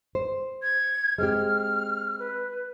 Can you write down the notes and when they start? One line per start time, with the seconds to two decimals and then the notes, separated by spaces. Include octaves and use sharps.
0.15 C5
0.62 G#6
1.18 G#3 C4 G4 F6
2.19 B4